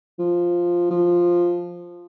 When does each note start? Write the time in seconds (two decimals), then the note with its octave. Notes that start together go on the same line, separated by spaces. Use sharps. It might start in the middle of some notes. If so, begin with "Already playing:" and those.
0.19 F3
0.90 F3